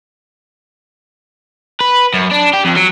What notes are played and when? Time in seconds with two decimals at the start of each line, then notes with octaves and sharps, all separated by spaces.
1.81 B4
2.14 F#2
2.32 D4
2.54 G4
2.65 F2
2.77 F#3